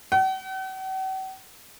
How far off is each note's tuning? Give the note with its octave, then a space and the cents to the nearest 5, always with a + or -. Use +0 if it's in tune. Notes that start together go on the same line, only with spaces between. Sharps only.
F#5 +45